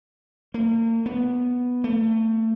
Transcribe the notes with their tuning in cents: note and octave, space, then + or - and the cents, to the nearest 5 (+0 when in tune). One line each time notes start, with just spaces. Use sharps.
A#3 -40
B3 +0
A3 +25